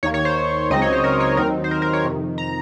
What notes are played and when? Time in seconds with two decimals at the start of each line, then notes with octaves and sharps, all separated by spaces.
0.03 D#2 D#3 A#3 C#5
0.14 C#5
0.25 C5
0.70 C#2 C#3 F#3 C4 D#4 D#5
0.82 C#5
0.93 C5
1.04 A#4
1.20 C#5
1.37 D#2 D#3 F#3 C4 D#4 A#4
1.64 C5
1.71 A#4
1.82 A#4
1.93 C#5
2.04 F2 C3 D#3
2.38 A#5